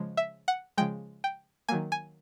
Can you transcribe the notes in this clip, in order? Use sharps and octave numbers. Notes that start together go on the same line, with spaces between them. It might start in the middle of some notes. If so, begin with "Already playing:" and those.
Already playing: C#3 F3 G#3
E5
F#5
C#3 F3 G#3 G5
G5
D#3 F#3 A#3 G#5
G#5